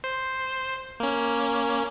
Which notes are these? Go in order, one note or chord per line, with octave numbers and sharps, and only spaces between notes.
C5
A#3 C#4